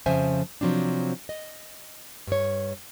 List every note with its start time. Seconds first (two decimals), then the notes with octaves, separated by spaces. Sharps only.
0.06 F2 C#3 F3 C5 E5 G#5
0.61 C3 F3 F#3 C4 D4
1.29 D#5
2.27 G2 C#5